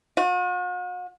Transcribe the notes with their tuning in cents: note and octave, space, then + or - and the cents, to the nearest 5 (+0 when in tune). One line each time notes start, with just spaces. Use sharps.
F#4 -45